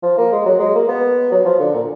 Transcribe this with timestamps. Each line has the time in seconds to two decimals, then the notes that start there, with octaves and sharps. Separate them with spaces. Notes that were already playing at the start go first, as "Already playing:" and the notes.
0.03 F3
0.18 A#3
0.32 G#3
0.46 F#3
0.60 G#3
0.75 A#3
0.88 B3
1.32 F#3
1.45 F3
1.59 D3
1.74 A#2